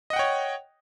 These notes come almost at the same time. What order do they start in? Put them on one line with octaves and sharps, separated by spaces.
D#5 F#5 G5 C#5